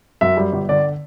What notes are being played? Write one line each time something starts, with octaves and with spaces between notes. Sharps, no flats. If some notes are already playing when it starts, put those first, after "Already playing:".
F#2 E5
G3
G1
D3 D5